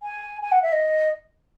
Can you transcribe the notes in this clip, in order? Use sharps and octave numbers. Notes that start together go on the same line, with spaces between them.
G#5
G#5
F#5
E5
D#5